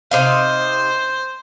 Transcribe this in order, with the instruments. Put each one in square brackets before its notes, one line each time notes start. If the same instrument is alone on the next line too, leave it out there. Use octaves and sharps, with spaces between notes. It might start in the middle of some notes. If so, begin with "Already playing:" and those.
[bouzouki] C3 D#4 F5 [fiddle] C5